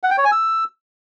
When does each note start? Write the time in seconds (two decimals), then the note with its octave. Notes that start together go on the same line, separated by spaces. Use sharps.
0.03 F#5
0.10 G5
0.18 C#5
0.25 G#5
0.32 E6